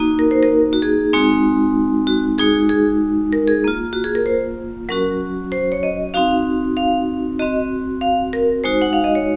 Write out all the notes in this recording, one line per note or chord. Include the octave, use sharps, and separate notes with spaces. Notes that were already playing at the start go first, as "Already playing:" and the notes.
Already playing: A#3 D#4 F#4
A#4
C5
A#4
F#4
G#4
G#3 C4 D#4 F#4
F#4
G#3 D#4 F#4 G#4
G#4
A#4
G#4
A#3 F4
F#4
G#4
A#4
C5
F#3 C#4 F#4 A#4
C5
C#5
D#5
C4 D#4 F#4 F5
F5
C4 F#4 D#5
F5
A#4
G#3 D#4 F#4 C5
F#5
F5
D#5
C#5